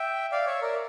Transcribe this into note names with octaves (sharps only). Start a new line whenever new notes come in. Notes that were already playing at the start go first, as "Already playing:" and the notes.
Already playing: E5 G5
D5 F5
C#5 E5
A#4 D5